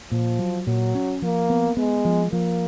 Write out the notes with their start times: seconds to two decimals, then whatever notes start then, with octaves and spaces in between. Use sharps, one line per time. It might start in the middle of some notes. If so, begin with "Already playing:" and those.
0.11 A#2 F3
0.39 F#3
0.67 A#2 F#3
0.95 C#4
1.22 F3 A#3
1.50 B3
1.77 G#3 B3
2.05 F3
2.32 F3 A#3